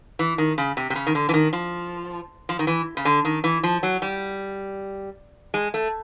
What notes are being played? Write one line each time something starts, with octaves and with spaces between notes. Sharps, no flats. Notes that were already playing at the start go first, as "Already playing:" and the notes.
E3
D#3
C#3
C3
C3
C#3
D#3
D3
E3
D#3
F3
F3
D#3
E3
C#3
D3
D#3
E3
F3
F#3
G3
G#3
A3